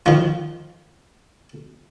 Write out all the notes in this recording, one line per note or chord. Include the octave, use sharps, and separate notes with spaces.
D#3 F3